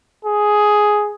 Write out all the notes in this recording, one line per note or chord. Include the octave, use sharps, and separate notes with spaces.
G#4